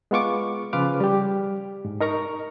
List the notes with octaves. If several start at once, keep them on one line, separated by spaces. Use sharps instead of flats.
G#3 B3 F4 C#6 D6
C#3 F3 F4 B4 D6 F6
G3 G4
G#2
D#4 A#4 A#5 C#6